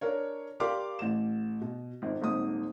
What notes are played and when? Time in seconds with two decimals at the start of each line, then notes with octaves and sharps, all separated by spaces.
0.01 D4 A#4 C#5
0.60 G4 A#4 D5 F5 C6 D6
0.99 A1 E7
1.62 B2
2.02 G#1 F2
2.21 D#1 G#1 G#2 D#6